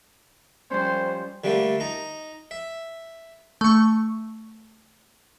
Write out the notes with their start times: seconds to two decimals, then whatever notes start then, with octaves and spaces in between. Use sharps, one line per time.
0.70 F3 G3 C#4 C5
1.44 D3 G3 A3 A#3
1.80 D#4 A#5
2.51 E5
3.61 A3 C#6